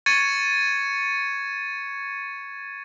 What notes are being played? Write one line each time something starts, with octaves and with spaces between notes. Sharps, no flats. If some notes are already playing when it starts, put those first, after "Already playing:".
C#6 G#6 A6 C#7 D#7